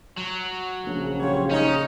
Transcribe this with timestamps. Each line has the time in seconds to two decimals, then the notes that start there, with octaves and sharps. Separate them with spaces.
0.17 F#3
0.86 A#1 C#3
1.20 G3 F4 C#5
1.51 C#4 D#4